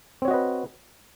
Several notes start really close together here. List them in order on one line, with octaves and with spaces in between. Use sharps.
C4 C#5 F#4 D#5 B4